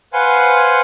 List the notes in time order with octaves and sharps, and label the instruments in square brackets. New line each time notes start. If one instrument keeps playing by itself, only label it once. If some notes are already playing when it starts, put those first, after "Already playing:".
[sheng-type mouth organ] B4 C5 F5 F#5 G#5 C6